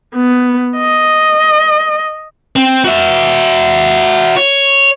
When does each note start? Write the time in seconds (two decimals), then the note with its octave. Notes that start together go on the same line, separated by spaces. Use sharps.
0.15 B3
0.78 D#5
2.56 C4
2.84 F#4 E5
4.37 C#5